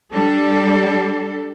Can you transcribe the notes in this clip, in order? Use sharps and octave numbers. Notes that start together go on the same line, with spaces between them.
G3 D4 A4